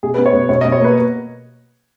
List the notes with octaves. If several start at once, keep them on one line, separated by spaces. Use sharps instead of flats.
B2 G#4
B4
B3
C#5
B2
B2 C#5
D#5
B2
C#5
A#3 B4